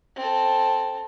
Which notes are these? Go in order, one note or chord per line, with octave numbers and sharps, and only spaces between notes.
C4 A4